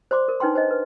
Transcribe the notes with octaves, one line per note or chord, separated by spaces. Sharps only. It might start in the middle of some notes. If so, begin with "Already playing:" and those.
C5 D5 C6 D6
A#4
D4 D#4 B4 G5 C6
C5 D#5
B4